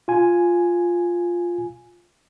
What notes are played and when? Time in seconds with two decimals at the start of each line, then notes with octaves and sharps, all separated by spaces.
0.08 F4 G#5